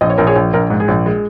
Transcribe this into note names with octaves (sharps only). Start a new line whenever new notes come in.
A#1 D#5
C#5
A#1 A#4
G#4 C#5
A#1
A#1 A#4
G#2
G#4
A#1
G#3